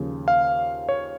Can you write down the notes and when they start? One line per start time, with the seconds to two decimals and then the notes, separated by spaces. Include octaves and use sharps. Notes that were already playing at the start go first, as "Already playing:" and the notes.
Already playing: D#2 C#3 F3
0.28 F5
0.89 C#5